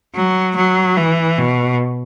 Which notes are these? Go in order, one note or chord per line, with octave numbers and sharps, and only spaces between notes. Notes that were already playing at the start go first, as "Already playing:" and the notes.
F#3
F#3
E3
B2